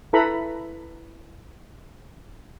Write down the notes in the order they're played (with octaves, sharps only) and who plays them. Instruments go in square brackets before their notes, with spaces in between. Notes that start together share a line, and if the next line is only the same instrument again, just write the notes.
[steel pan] E4 A4 B4 A#5 B5